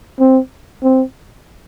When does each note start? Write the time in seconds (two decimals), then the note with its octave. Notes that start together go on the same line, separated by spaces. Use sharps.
0.20 C4
0.83 C4